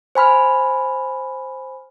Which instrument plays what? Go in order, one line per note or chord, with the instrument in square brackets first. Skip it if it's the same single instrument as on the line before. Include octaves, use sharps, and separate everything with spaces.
[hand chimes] C5 G#5 B5 F6